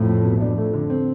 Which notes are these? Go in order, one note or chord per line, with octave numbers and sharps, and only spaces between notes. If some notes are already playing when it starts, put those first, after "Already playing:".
Already playing: F2 A2
A3
B2
F2 D4
A3
D3
C4